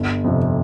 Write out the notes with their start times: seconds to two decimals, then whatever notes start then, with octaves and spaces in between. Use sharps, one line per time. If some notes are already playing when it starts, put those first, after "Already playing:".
Already playing: G1
0.24 F2 C3